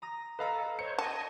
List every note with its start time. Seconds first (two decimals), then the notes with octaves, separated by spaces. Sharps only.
0.02 A#5 D#6 A#6
0.39 A4 B4 D#5 F5 A#5 B6
0.79 C5 C#5 C#7
0.98 D#5 G#5 A5